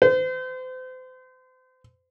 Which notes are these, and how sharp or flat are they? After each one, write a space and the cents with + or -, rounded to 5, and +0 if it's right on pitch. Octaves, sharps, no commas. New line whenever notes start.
C5 -35